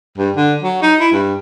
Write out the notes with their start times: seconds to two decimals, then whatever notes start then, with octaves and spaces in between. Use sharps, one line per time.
0.18 G2
0.36 D3
0.63 F#3
0.82 D#4
1.00 E4
1.12 G2